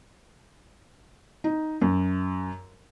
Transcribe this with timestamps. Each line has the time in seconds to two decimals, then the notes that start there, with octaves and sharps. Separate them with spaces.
1.44 D#4
1.82 F#2